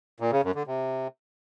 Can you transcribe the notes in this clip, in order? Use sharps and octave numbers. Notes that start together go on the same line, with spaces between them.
A#2
C#3
F#2
D3
C3